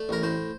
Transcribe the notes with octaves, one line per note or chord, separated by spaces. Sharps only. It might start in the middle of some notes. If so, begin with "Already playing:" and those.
Already playing: A3 D5
A1 A#4
A2 C5